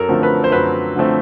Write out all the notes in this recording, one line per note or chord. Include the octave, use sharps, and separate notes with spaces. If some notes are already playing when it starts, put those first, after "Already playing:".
Already playing: F#2 A4 A#4
D3 F3 A3 C4
B4
C5
F#2 B4
D3 F3 A3 C4